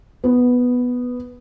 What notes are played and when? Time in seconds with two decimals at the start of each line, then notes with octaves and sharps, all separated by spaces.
0.24 B3